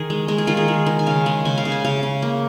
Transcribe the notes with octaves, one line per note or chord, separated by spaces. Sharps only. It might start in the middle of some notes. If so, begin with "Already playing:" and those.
Already playing: D#3 G#4
G#3
G#3 A#4
G#4
D#3 F4
G#4
G#3
D#3
G#5
C#3 F5
G#3
C#3 G#5
F5
C#3
G#5
C#3 F5
C#3
A#3